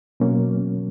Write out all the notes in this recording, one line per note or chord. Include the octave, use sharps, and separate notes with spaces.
B2 F#3 A#3 C#4